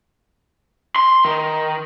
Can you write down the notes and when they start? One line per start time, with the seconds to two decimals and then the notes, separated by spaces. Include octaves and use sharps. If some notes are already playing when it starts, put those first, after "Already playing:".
0.96 C6
1.25 D#3